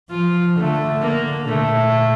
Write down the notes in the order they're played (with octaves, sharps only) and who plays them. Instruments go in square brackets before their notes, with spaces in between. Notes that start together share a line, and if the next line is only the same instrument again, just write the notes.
[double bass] F3 [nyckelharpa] F4
[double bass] D3 [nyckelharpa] A3
[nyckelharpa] A#3
[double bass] A#2 [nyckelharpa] A3